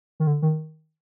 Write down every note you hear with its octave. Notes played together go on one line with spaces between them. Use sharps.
D#3
D3
D#3